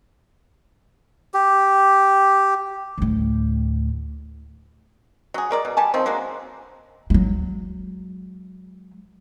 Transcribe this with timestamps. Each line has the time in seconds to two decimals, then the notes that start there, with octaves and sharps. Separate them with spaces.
1.34 G4
2.98 D2 A2
5.34 F#3 G#4
5.51 G#3 A#4 D5
5.65 B2
5.77 G3 G#5 A5
5.94 D#3 F3 C4
6.06 F#3 G#3 A#3 D4
7.10 F#3 G#3